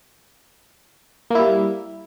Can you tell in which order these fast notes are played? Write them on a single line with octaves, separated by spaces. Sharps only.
A#3 E4 G3